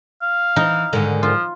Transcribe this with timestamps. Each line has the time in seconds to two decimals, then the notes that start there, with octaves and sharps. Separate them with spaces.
0.22 F5
0.56 E3 D#4
0.93 G#2 D3 D#3
1.23 F3 F4